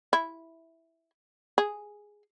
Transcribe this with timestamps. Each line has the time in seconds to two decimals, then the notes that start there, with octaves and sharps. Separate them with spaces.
0.13 E4
1.58 G#4